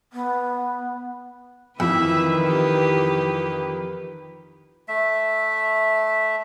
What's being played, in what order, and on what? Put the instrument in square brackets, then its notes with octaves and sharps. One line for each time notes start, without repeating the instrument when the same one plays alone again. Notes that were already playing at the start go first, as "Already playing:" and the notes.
[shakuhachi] B3
[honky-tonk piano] F2 E3 [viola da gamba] D#3 B4 [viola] E5
[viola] G4
[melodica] A3 E5